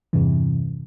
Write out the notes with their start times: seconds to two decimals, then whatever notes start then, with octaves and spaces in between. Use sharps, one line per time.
0.13 E2 G2 C3 E3